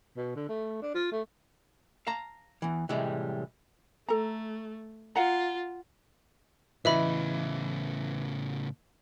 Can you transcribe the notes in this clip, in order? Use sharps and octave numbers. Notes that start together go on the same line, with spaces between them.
B2
D3
A3
D4
F4
A3
F5 A5 A#5
E2 E3
A2 C3 E3 G3 G#3
A3 A4 A#5
F4 F5 F#5 A#5
A2 C#3 E3 D#5 E5 B5